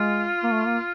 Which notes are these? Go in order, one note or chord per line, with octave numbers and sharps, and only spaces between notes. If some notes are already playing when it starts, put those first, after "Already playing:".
Already playing: G#3 F4
A#3
A3
A#3